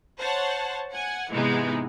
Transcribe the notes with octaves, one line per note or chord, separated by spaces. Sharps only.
C5 C#5 F#5 A5
F#5 G#5
G#2 C3 E3 G#3 B3 D#4